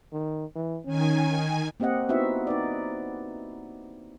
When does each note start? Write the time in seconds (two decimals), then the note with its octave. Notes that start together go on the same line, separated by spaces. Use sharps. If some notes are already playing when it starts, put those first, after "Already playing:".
0.13 D#3
0.56 E3
0.85 D#3 C#4 G#5
1.80 A#3 C4 G4 D#5 F#5
2.09 B3 C4 D#4 E4 F#4 E5
2.47 D#4 B4 D5